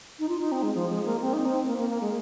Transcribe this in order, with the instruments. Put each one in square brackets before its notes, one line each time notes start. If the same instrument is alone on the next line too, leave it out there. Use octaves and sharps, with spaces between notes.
[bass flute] D#4
F4
D#4
C4
G#3
F3
G#3
A#3
C4
D#4
C4
A#3
A#3
A#3
G#3